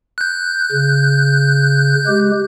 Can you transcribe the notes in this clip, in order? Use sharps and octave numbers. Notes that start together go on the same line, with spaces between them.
F#6 G6
C#3
G#3 G4